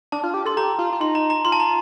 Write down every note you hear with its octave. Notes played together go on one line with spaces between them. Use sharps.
D4 A5
F4
G4
A4 C6
G4 A#5
F4
F4
D#4 C6
A#5
A#5
F4 C6
A5
A#5